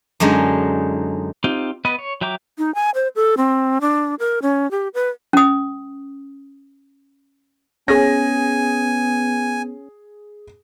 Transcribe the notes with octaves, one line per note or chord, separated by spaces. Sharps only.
F#2 D3 G#3 D#4
C4 D#4 F4 G4
B3 B4 D#5
C#5
F#3 E5 G5 A#5 D6
D#4
G#5
C5
A4
C4
D4
A#4
C#4
G4
B4
C#4 D#6
B3 C#4 G#4 G#5 A#6